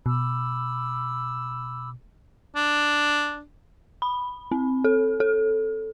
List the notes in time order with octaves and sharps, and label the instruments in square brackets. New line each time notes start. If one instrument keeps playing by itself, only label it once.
[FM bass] B2 [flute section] B5 D6 E6
[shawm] D4
[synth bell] B5
C4
A4
A4